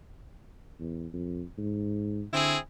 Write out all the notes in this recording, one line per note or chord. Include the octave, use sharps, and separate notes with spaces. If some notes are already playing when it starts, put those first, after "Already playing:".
E2
F2
G#2
D3 C4 E4 G#4